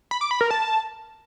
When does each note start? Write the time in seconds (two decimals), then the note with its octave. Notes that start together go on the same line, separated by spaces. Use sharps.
0.11 B5
0.21 D6
0.31 B5
0.41 A#4
0.51 A5